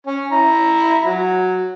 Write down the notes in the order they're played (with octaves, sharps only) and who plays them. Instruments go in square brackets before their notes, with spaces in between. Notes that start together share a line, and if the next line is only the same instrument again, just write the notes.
[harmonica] C#4
E4 A#5
F#3